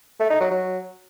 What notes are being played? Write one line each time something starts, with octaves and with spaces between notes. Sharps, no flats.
A3
D#4
F#3
F#3